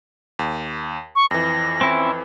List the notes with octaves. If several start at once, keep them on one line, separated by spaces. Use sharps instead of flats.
D#2
C#6
F2 E3 A#6
C4 C#4 E4